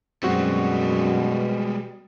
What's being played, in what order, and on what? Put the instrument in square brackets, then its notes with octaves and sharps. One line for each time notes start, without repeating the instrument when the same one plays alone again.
[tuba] F#2 [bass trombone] B2 [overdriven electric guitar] G3 G#3 [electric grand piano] C4 F#4